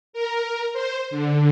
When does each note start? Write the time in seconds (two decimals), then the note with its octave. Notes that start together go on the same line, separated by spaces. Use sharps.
0.13 A#4
0.73 C5
1.11 D3